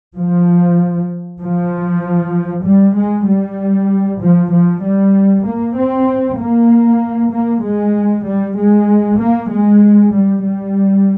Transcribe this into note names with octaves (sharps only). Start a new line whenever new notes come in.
F3
F3
G3
G#3
G3
F3
F3
G3
A#3
C4
A#3
A#3
G#3
G3
G#3
A#3
G#3
G3
G3